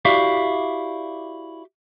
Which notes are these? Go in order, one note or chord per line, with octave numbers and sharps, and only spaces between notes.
E4 F#4 G4 D5 E5 F5